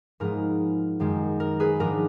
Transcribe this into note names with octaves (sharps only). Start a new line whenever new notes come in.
G#2 F3 G#3 B3 A#4
F#2 D#3 G#3
A#4
G#4 B4
G#2 F3 B3 D4 A#4